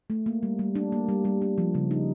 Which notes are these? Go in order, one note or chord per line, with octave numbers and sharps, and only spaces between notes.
A3
A#3
G3
G3
D4
A#3
G3
G3
D4
F3
C#3
D#4